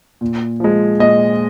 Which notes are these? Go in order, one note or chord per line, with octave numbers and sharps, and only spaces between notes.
A#2
F3 G#3
A#2 D#5